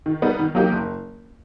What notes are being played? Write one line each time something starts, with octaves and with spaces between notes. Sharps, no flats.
D#3
G3 B3 D#4
D#3
F#3 A#3 D#4 G4
F#1